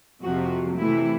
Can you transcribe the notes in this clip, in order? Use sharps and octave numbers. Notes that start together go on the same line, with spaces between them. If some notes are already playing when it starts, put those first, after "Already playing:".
F2 C3 F3 F#4
C3 E3 A3 E4